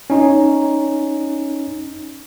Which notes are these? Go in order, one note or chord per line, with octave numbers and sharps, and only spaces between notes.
C#4 D#4